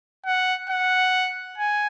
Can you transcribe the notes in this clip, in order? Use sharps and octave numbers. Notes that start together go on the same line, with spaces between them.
F#5
F#5
G#5